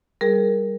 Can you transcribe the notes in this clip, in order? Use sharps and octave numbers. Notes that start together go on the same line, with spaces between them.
G3 G#4 A#4